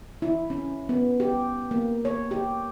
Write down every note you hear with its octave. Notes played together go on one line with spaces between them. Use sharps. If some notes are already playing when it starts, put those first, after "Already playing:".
E4
C#4
B3
G4
A#3
C#5
G4